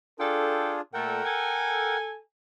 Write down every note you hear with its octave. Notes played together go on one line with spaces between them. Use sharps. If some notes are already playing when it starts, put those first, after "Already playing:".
D4 F4 G#4 A4 G5
A#2 A3 A4 A#4 F#5 G5
A4 G#5